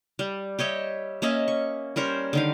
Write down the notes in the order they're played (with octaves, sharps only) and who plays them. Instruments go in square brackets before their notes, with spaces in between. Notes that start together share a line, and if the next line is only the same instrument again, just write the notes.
[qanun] G3
G4 C#5 D#5 E5
A#3 C#4 D#5 E5
C#6
G3 C#4 A#4 C5
D3 D#3 F5